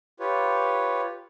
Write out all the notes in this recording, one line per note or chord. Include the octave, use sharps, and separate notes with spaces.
F4 G4 B4 C#5